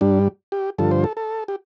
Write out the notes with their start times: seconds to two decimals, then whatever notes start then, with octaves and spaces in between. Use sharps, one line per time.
0.01 G2 G3 D4
0.52 G4
0.78 G2 D3 F3 A4
0.91 C5
1.04 A4
1.17 A4
1.48 G4